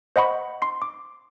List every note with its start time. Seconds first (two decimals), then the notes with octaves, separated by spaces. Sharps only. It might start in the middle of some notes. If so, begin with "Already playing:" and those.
0.16 C5 D#5 F#5 B5 C#6
0.62 C6 C7
0.82 D6